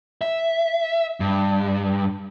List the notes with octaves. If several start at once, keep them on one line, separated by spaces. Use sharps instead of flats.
E5
G2